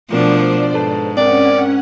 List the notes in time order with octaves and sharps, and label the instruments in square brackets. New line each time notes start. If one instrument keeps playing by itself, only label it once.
[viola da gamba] B2 F3 D4 [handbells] A3 A#4 [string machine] C5 D5
[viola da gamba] G#2 [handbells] A4 B4 A5
[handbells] C4 A#4 [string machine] C#4 F#5 [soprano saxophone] D5